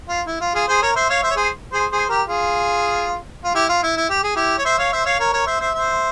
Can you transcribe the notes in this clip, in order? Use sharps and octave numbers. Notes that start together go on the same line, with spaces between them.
F4
E4
F4
F4 G#4
G#4 C5
A#4 C#5
C5 E5
C#5 F5
C5 E5
C#5
G#4 C5
G#4 C5
G#4 C5
G4 A#4
F4 G#4
F4
E4 G4
F4
E4
E4
G4
G#4
E4 G4
C#5
C5 E5
C#5 F5
C5 E5
C#5 F5
A#4 C#5
A#4 C#5
C5 E5
C5 E5
C5 E5